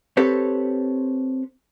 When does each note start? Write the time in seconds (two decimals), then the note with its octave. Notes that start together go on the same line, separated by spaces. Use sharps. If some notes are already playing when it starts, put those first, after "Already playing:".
0.17 C4 G4 A4 B4 C#5